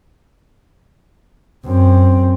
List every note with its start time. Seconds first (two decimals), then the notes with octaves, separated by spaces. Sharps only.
1.65 F#2 C4